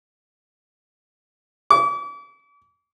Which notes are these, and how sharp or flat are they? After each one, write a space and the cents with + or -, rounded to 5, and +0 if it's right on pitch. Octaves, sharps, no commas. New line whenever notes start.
D6 -40